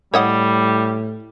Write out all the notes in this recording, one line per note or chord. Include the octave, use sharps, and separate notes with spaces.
A2 G3 C#5 D#5 F#5